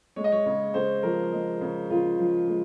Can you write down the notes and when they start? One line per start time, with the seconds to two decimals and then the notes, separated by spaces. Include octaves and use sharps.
0.16 G#3 C#5
0.24 D#5
0.32 C#5
0.46 C#3 C#5
0.74 C#3 C5
1.03 F3 A#4
1.32 G#3
1.61 C#3
1.90 C#3 F4
2.19 F3
2.48 G#3